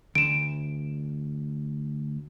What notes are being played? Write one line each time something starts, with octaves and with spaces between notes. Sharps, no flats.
D2 D7 E7